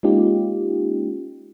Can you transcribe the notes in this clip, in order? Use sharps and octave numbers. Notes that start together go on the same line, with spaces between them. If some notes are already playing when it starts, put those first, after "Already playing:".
G#3 A#3 C#4 D#4 F4 G4